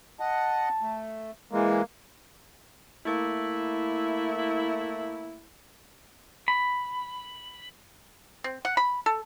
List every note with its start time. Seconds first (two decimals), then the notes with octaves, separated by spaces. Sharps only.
0.20 D#5 F#5 A5
0.81 A3
1.52 E3 G#3 A#3
3.06 A3 A#3 E4
6.48 B5
8.44 C4
8.65 F#5
8.77 B5
9.06 A4